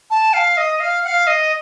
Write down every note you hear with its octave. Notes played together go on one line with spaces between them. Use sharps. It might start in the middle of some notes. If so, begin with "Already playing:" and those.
A5
F5
D#5
F5
F#5
F5
D#5